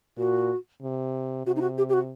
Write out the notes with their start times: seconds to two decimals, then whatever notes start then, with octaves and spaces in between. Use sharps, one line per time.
0.17 A#2 F#4
0.82 C3
1.45 C3 F#4
1.56 D#4
1.61 F#4
1.78 G4
1.89 G4
1.94 F#4